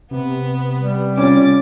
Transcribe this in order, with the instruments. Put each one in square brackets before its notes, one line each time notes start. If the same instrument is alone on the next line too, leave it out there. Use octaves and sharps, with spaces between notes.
[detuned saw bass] C3 [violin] B3
[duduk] G3
[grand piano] C#4 F4 [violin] D6 A6